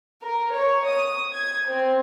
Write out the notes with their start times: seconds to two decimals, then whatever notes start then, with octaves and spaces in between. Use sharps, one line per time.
0.22 A#4
0.55 C#5
0.88 D#6
1.34 G#6
1.69 C4